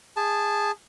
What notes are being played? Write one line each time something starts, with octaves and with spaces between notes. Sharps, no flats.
G#4 A5